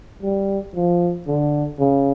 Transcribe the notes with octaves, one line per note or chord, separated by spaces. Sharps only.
G3
F3
D3
C#3